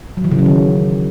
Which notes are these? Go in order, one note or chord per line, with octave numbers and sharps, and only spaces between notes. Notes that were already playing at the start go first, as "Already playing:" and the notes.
F#3
E3
C#3
F#3
D#3